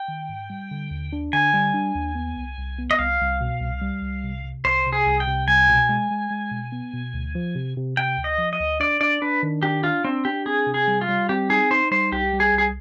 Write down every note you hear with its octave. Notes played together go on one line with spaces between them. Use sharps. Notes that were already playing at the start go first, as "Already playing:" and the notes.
Already playing: G5
D#3
G#2
G3
D3
D#2
D4
D3 G#5
G3
D4
D#2
B3
C2
C2
B3
D#5
C2 F5
C2
B2
C2
G3
C2
C3
C3
C2 C5
C3
G#4
C2
G5
C3
C2 G#5
B2
G#3
G#3
G#3
B2
B3
B2
D2
F3
C3
C3
C3 G5
D2
D#5
F3
D#5
D2
D4 D5
D4 D5
D4 B4
D#3
D4 G4
D4 F4
C4 D4
D4 G4
C4 G#4
C3
G#4
G3
F4
G3
C4 G4
D#4 G#4
D#4 C5
G3 C5
C2 G4
G3
G#4
C2 G#4